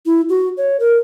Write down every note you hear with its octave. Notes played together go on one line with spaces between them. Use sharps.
E4
F#4
C#5
A#4